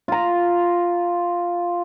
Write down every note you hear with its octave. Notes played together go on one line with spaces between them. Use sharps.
F4 A#5